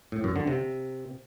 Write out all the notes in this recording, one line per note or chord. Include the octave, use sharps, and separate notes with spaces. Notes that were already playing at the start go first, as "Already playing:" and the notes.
A2
F#2
D3
C3